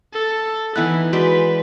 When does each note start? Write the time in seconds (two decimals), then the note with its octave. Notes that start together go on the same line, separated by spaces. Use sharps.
0.13 A4
0.76 E3 B3 D#4 E4 F#6
1.13 G#3 F#4 B4 D5 C6